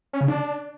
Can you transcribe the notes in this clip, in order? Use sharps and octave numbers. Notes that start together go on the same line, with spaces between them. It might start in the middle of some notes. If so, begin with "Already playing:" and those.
C#4
C#3
D4